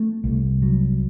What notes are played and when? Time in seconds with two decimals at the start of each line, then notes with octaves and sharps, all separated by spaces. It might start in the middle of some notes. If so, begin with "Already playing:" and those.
Already playing: A3
0.24 C2
0.62 F#3